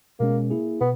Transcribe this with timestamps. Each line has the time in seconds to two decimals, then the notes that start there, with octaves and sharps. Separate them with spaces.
0.20 B2 G#3 A#3 C#4
0.50 A#3 E4 G#4
0.80 B2 B3